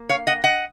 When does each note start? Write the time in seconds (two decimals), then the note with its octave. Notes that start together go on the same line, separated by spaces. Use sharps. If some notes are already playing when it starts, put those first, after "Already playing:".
Already playing: A#3
0.09 C#5 F5
0.27 D#5 F#5
0.44 D#5 F#5